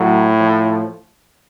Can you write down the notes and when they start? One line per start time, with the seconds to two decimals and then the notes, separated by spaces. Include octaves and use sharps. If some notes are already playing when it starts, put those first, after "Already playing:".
Already playing: A2 F#3
0.40 F3